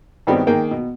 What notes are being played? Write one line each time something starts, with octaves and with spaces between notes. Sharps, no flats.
G2 D#3 G3 G#3 B3 C4
D#3 A#3 G#4 G5
B2